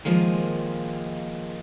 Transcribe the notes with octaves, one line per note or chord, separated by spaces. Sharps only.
D#3 F3 G#3 A#3